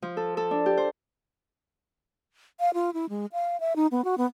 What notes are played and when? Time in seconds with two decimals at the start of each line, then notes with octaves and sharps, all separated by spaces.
0.02 F3
0.17 A4
0.37 A4
0.51 D4
0.66 G4
0.77 C5
2.60 F5
2.74 F4
2.94 E4
3.09 G#3
3.33 F5
3.60 E5
3.76 D#4
3.91 B3
4.04 F#4
4.18 B3